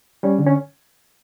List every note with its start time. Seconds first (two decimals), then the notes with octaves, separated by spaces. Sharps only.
0.23 G3 C#4
0.39 D3
0.47 C#4